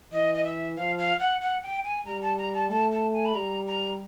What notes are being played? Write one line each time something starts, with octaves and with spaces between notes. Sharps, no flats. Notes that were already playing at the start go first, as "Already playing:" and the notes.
E3 D#5
D#5
E5
F3 F5
F5
F#5
F#5
G5
G#5
G3 A#5
A5
A#5
A5
A3 A5
A5
G#5
B5
G3 A#5
A#5